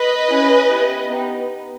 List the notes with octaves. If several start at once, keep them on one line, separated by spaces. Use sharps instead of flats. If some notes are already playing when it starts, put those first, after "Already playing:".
Already playing: B4 D#5
C#4 E4 G#4
B3 E4 G4
B3 D#4 G4